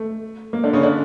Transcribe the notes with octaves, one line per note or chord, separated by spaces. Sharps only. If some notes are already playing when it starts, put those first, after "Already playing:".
Already playing: A3
A#3
D3 D4
C#3 C#4
D3 D4